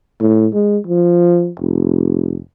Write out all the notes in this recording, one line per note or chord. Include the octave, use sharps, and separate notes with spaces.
A2
G#3
F3
F1